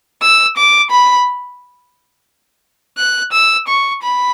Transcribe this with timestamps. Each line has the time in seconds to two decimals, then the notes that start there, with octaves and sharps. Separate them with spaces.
0.22 E6
0.57 D6
0.91 B5
2.98 F#6
3.32 E6
3.68 C#6
4.03 B5